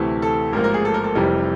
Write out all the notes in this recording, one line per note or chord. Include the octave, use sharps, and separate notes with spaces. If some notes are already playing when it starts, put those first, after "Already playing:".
Already playing: D2 C3 E3 A3
A4
A1 G#2 F3 A#3 A#4
A#4
G#4
A4
A#4
A4
F1 F2 C3 E3 G3 A#4